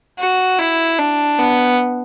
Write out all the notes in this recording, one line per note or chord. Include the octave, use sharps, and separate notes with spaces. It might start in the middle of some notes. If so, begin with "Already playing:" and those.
F#4
E4
D4
B3